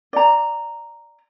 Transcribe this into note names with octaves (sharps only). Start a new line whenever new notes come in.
D5 A#5